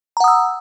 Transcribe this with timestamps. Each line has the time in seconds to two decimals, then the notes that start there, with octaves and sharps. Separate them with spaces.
0.17 A#5
0.20 F#5
0.24 D#6
0.28 E6